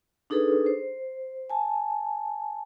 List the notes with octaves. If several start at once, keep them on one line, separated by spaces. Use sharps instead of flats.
D4 D#4 G#4 A4 B4
C5
G#5 A5